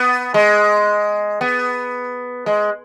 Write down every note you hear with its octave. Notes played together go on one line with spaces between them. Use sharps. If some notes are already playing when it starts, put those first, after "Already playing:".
Already playing: B3
G#3
B3
G#3